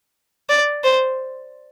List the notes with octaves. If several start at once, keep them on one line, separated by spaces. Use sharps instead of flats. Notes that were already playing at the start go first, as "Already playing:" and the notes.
D5
C5